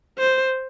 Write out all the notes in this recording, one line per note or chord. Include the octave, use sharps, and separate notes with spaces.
C5